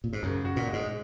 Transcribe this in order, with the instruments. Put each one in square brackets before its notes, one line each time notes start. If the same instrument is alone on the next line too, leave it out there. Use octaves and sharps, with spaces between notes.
[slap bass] A#2
G#2
[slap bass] F#2 [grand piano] C#3
[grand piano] F#4
[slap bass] A#2
[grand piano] G#3
[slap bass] G#2